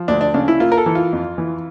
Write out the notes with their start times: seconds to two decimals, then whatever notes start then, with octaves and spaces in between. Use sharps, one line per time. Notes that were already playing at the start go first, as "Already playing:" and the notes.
Already playing: F3
0.08 D2 D4
0.21 D4
0.34 C#3 D4
0.48 E4
0.60 A#3 F4
0.72 A#4
0.78 A4
0.86 E3
0.95 F4
1.13 F2
1.38 E3